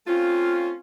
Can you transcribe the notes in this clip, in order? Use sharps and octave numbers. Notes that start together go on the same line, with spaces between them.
A3 C4 C#4 F4